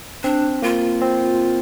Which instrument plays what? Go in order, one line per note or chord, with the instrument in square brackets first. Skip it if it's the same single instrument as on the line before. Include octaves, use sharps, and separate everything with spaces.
[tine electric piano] C4 [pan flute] D4
[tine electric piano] A#3 [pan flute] F4
[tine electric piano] C4